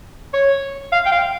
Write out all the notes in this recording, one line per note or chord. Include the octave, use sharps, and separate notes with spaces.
C#5
F5
G5
F5